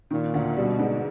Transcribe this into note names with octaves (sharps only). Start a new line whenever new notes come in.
A#2 D#3
D2
B2 G3
G#2